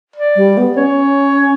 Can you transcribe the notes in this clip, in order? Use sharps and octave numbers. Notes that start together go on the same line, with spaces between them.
D5
G3
B3
C#4 C#5